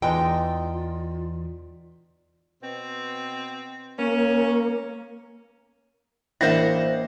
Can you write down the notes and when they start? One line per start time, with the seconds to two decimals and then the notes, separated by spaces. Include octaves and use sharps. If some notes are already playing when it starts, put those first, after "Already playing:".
0.02 E2 D3 E3 G#3 D#4 F4 G5
2.63 B2 C4
3.99 A#3 C#4
6.41 A1 A#3 D4 E4 C5 F5 F#5 A#6